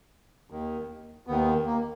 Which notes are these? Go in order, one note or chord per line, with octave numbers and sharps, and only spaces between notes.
D#2 D#3
D#2 D#3 B3
A#3